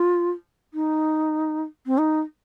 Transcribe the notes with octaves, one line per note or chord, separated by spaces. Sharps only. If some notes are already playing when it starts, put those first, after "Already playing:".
Already playing: F4
D#4
C4
D#4